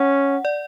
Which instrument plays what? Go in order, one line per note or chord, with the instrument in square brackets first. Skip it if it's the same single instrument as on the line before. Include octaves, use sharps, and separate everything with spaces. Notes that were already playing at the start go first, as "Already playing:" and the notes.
Already playing: [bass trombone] C#4 [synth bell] F#5
[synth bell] D5